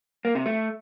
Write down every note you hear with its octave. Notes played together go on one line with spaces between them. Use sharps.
A#3
C3
A3